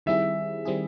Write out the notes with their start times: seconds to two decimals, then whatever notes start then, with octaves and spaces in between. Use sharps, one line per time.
0.06 D#3 G3 C4 E4 G#4 E5
0.65 D#3 G3 C4 E4 G#4